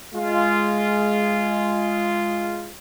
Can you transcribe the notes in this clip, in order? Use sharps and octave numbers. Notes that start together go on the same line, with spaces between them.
G#3 F4